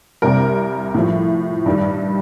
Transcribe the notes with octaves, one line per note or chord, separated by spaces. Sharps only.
C2 C3 G3 A#4
A2 F3
G2 D#3 G3